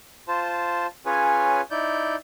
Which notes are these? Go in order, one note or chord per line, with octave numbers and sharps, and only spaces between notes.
F4 C5 A5
C#4 F4 G#4 B4 C#5 G#5
D#4 E4 D5 G6